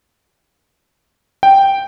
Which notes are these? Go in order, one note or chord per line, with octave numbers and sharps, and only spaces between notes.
G5